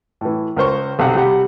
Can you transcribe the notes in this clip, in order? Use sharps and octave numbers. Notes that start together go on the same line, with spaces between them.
A2 E3
C#2 A#4 C5 C#6
B1 C3 F5 F#5
C3 G3 G4 F#5